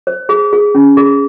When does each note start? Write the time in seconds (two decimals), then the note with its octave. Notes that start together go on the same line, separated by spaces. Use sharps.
0.07 C5
0.29 G#4
0.53 G#4
0.75 C#4
0.97 G#4